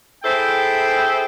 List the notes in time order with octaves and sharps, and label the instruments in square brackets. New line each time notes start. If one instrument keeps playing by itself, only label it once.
[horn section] E4 G#4 A4 C5 G5